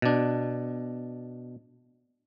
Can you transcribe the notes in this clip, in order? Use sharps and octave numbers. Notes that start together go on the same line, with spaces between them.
B2 D4